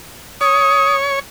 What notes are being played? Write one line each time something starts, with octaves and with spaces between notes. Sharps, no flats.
C#5 D#6